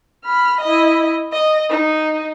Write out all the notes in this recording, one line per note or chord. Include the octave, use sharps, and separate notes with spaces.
B5 F6
E4 D#5
D#5
D#4